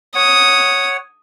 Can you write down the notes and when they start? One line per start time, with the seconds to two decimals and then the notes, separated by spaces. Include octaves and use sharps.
0.15 C#5 F#5 D#6